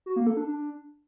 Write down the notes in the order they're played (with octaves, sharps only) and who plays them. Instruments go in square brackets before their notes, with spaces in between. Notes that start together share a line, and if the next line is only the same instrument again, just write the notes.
[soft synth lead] F#4
A#3
A4
D4
D4